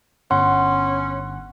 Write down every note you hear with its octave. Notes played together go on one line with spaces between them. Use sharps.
G1 C#4 F#5 C6